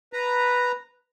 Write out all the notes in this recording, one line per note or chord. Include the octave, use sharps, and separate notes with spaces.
B4 A#5